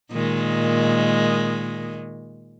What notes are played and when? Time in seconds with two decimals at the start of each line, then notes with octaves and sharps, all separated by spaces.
0.11 A#2 D#3 G#3